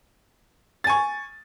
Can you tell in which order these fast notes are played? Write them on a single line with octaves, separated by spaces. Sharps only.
A6 G#5 C#6